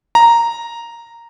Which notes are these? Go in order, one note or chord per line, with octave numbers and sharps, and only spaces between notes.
A#5